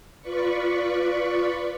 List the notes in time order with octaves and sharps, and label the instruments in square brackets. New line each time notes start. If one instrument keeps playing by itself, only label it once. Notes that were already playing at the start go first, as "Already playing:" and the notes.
[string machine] F4 B4 D5 B5 C#6